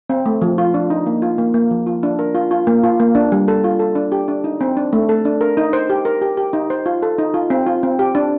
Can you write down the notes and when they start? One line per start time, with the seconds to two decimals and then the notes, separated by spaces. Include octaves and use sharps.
0.10 C4
0.26 A3
0.41 F3
0.58 F4
0.74 D4
0.90 D#4
1.06 A#3
1.22 F4
1.38 A#3
1.54 A#3
1.71 F3
1.87 F4
2.03 D4
2.19 A#4
2.35 F4
2.51 F4
2.67 A#3
2.83 F4
3.00 A#3
3.15 D4
3.32 G3
3.48 A4
3.64 F4
3.79 A4
3.95 D4
4.12 G4
4.28 D4
4.44 D#4
4.61 C4
4.77 D4
4.93 A3
5.09 A4
5.25 D4
5.41 A#4
5.57 D#4
5.73 C5
5.90 G4
6.05 A#4
6.22 G4
6.37 G4
6.53 D#4
6.70 C5
6.86 F4
7.02 A4
7.18 D#4
7.34 F4
7.50 C4
7.67 F4
7.83 C4
7.99 G4
8.15 D4